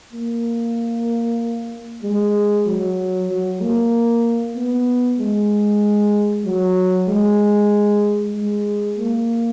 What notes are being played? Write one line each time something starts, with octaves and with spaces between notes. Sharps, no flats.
A#3
G#3
F#3
F#3
A#3
B3
G#3
F#3
G#3
G#3
A#3